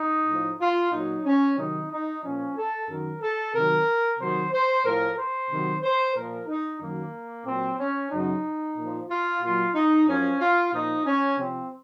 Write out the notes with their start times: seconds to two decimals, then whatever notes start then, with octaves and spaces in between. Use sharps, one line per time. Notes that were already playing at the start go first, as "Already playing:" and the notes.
Already playing: D#4
0.27 A2 F3
0.60 F4
0.92 A#2 F#3 D#4
1.25 C#4
1.58 C3 D#3 F#3 D#4
1.91 D#4
2.23 A#2 F3 C#4
2.56 A4
2.89 F#2 D#3 F#3 A#4
3.21 A4
3.54 C3 D#3 F#3 A#4
4.19 C3 D#3 F#3 C5
4.52 C5
4.84 A2 F3 A#4
5.17 C5
5.50 C3 D#3 F#3
5.83 C5
6.15 A#2 F3 A#4
6.48 D#4
6.81 F#2 D#3 F#3 A#3
7.46 A#2 F#3 C4
7.79 C#4
8.11 F#2 C#3 F#3 D#4
8.77 A#2 F3
9.09 F4
9.42 A#2 F#3 F4
9.75 D#4
10.07 F#2 F3 C#4
10.40 F4
10.73 A#2 F3 D#4
11.05 C#4
11.38 C3 F3 C4